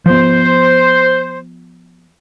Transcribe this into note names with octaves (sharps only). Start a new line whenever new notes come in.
F3 B3 C5